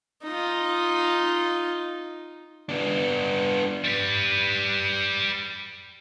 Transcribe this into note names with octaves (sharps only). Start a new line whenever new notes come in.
D#4 F4
B3 D4
G3 B4